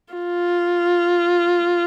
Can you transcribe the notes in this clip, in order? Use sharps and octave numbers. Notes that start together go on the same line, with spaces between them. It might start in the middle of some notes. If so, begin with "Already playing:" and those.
F4